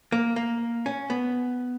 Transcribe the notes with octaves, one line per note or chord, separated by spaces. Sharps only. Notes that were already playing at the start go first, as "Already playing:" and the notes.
A#3
A#3
C#4
B3